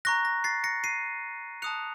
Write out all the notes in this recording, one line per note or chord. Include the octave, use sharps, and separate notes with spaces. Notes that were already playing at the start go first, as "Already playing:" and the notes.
A#5 C#6 F#6 A#6
A#6
A6 C7
A#6 C#7
C7 D#7
A5 D#6 F#6 C#7 F7